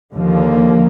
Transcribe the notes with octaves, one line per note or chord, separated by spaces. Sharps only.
D#2 D3 F3 A#3